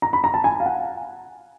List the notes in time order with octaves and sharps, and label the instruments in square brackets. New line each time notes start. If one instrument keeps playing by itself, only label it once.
[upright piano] A#5
B5
A#5
A5
G#5
F5
F#5